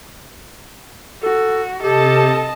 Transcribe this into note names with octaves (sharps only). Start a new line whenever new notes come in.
F#4 A4
C3 G4 A4 D#5 A5